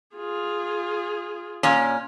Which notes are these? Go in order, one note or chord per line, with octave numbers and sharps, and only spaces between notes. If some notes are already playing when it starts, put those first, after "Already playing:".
F4 G#4
A#2 C#4